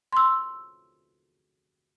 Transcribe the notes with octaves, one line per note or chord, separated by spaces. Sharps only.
C6 E6